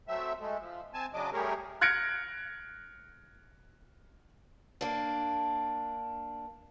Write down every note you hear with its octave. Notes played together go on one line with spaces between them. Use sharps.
F#3 A3 C4 E5
G#3 A3
F3
C4 G#5 A5
C#3 F#3 D4 D#5 D6
G3 A3 G4 G#4 A#4 C#5
F6 F#6 G#6 A#6 C#7 D7
A#3 D4